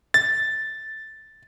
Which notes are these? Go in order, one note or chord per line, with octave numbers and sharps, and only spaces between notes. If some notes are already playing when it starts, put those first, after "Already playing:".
A6